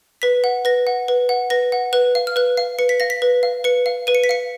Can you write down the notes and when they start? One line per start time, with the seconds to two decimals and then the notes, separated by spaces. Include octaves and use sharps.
0.22 B4 B6
0.44 F#5
0.65 B4 A#6
0.87 F#5
1.08 B4
1.29 F#5
1.50 B4 A#6
1.72 F#5
1.93 B4 F#6
2.15 F5
2.27 F6
2.36 B4 F#6
2.57 F5
2.79 B4 C#7
2.89 B6
3.00 F5 A#6
3.10 B6
3.22 B4
3.43 F5
3.64 B4 C#7
3.86 F5
4.07 B4 D#7
4.15 C#7
4.24 B6
4.29 F5 C#7